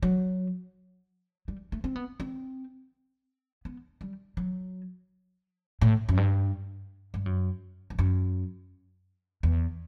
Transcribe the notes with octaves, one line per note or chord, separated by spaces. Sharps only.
F#3
G3
A3
C4
B3
C4
B3
G3
F#3
A2
F#2
G2
G2
F#2
E2
F#2
E2